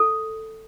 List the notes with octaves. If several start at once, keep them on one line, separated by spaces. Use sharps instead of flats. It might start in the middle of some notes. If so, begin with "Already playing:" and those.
Already playing: A4